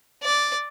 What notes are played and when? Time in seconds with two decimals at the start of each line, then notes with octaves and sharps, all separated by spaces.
0.23 D5